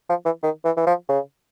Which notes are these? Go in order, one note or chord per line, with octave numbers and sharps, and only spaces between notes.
F3
E3
D#3
E3
E3
F3
C#3